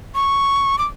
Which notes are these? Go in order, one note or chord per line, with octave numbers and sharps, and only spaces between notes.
C#6
D6